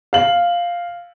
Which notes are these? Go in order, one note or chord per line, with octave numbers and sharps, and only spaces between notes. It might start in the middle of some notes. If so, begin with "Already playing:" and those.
F5 F#7